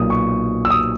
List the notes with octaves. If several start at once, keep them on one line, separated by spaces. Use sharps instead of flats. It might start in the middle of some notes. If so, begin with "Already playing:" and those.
Already playing: B1 A#2 A#3 D#6
C#6
E6
D#6